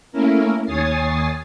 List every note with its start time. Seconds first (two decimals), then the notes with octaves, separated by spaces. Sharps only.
0.12 A3 A#3 C#4 E4 A#4
0.65 D#2 C#5 G#5 D#6 A6 C7